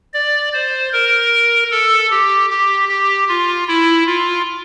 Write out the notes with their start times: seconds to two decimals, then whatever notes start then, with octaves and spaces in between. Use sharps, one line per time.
0.14 D5
0.54 C5
0.93 A#4
1.71 A4
2.11 G4
2.50 G4
2.89 G4
3.29 F4
3.68 E4
4.07 F4